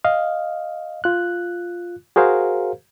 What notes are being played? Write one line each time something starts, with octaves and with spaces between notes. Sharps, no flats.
D#5 F5
F4 F#6
F#4 G#4 A#4 C5 F5